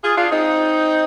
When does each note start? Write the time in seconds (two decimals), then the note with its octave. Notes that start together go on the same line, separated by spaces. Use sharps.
0.03 F4 G#4
0.17 D4 F4
0.31 C4 D#4